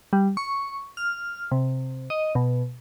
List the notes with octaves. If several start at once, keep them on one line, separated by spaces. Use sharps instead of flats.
G3
C#6
F6
C3
D#5
B2